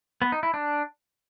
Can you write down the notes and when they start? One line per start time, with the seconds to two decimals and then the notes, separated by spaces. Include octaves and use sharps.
0.22 B3
0.32 D#4
0.43 E4
0.54 D4